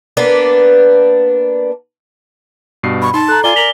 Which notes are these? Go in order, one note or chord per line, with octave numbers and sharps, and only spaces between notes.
A#3 B3 D4 B4
G2 B2 C7
B5 C#6
D#4 A5 C6
A4 A#5 F#6
F4 D5 G#5 G7
A#4 B6 F7 F#7